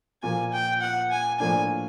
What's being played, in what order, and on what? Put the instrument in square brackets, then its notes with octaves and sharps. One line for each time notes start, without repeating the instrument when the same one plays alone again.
[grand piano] A#2 F3 A#3 [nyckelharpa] G#5
[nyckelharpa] G5
F#5
G#5
[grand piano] A2 F3 A#3 D4 [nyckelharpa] G#5